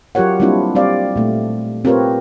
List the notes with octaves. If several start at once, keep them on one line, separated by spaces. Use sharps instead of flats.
F#3 F4 G4 A#4 C#5 F#5
G3 A#3 C4 D4 E4 F4
G3 C4 G4 C5 D5 F5
A#2 A3
C4 F4 G4 A#4 B4 C#5